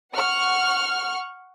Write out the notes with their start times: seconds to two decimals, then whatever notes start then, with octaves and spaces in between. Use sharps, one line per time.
0.15 F#5 C#6 F6